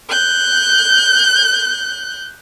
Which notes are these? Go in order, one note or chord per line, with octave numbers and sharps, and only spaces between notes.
F#6 G6